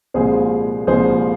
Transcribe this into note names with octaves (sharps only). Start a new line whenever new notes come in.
C2 A#2 F3 G#3 G#4 C5
C2 A#2 F3 G#3 G#4 C5